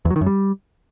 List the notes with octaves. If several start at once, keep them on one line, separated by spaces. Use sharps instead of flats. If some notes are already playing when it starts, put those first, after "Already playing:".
E2
F#3
D#3
F#2
G3